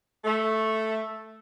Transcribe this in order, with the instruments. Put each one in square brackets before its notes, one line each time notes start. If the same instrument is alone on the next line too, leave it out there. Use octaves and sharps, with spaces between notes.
[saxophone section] A3